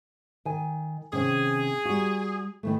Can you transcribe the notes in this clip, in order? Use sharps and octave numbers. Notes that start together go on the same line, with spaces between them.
D#3 G#5
C3 D#3 C#4 G#4
G3 F#4
D#3 E3 A3